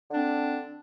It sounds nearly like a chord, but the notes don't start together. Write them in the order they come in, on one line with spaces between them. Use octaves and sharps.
D3 D4 C4